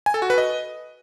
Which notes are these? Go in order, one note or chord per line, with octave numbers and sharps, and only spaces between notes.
G#5
A4
F#4
B4
D#5